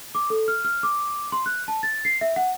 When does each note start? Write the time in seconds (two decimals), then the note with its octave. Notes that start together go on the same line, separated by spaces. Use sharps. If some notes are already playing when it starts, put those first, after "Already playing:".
0.15 D6
0.30 A4
0.48 F6
0.65 F6
0.83 D6
1.32 C6
1.46 F#6
1.68 A5
1.83 A6
2.05 C7
2.21 E5
2.36 F#5